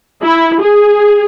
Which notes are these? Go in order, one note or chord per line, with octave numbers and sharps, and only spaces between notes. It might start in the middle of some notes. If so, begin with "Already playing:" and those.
E4
G#4